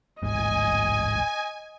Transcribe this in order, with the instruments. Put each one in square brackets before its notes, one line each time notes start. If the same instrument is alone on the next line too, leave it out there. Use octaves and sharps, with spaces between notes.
[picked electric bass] D1 A1 G#2 [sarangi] D#5 [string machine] G#5